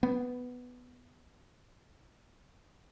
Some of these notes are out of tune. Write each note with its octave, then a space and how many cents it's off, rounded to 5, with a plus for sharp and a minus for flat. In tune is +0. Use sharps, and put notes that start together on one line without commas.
B3 +5